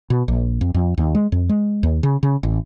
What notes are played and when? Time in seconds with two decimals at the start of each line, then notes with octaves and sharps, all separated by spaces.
0.10 B2
0.28 A#1
0.61 F2
0.74 F2
0.98 D#2
1.15 G#3
1.32 F2
1.49 G#3
1.83 D#2
2.03 C#3
2.23 C#3
2.43 A1